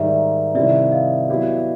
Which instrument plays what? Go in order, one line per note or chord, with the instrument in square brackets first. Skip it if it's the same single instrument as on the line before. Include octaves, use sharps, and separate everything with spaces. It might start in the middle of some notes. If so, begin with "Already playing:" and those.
Already playing: [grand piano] G#2 D#3 G3 [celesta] D5 E5
[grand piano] C3 D#3 G3 C4 E4 [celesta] D5 E5
[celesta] D#5 F5
[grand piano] F#3 B3 E4 G4